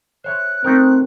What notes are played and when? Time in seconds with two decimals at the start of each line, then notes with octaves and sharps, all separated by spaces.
0.24 C5 C#5 E5 F#6
0.64 A3 C4 D#4 A#4